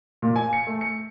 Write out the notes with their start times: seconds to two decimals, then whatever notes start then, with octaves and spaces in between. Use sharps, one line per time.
0.22 A#2
0.36 G#5
0.53 C#7
0.67 A3
0.81 C#7